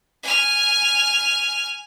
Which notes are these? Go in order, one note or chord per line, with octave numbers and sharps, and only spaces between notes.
G#5 F6